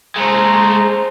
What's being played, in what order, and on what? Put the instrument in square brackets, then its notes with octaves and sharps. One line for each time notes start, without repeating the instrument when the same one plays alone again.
[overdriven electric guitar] G#3 A3 [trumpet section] C5 A#5